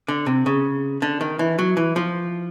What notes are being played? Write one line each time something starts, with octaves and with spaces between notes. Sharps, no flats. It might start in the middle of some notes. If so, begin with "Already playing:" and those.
D3
C3
C#3
D3
D#3
E3
F#3
E3
F3